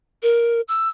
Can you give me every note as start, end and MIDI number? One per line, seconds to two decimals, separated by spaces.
0.23 0.61 70
0.68 0.89 88